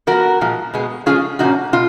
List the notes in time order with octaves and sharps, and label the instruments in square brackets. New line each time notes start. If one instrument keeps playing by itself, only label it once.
[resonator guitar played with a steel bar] F3 B3 F#4 A#4
A#2 F3 G#3
B2 G#3 B3
F3 G#3 C#4 F4 G#4
A#2 F3 A#3 C#4 D#4 F#4
B2 F4